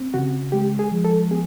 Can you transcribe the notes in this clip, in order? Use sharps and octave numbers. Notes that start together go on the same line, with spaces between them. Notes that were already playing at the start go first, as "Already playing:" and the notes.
Already playing: C4
C#3 F#4
G#3 G4
G#4
F3
A4
B3 G#4